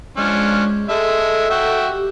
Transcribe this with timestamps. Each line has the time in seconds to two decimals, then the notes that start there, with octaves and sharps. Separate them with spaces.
0.17 F3 G#3 C#4 D4
0.89 G#3 A4 E5
1.50 F#4 E5 G5
1.89 G4